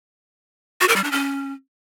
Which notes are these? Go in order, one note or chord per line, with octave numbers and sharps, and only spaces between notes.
F#4
A#4
G3
D4
C#4